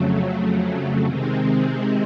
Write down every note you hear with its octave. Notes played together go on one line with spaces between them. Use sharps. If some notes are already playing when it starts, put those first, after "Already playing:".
Already playing: F2 C#3 F#3 A3
C3 D#3 G#3 C4